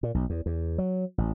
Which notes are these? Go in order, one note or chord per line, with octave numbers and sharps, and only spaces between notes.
A#2
B1
E2
E2
F#3
A1